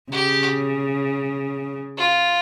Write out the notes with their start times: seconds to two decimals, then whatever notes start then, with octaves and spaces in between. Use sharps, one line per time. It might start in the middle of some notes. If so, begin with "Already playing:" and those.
0.11 C#3 G4
1.98 F4